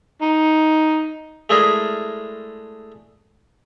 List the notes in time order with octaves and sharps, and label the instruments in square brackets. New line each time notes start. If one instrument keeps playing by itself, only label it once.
[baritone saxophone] D#4
[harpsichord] G#3 A3 D4 E4 G#4 A#4